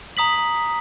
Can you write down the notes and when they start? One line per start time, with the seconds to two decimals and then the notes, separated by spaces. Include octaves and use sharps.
0.17 A#5 D#6 B6 F#7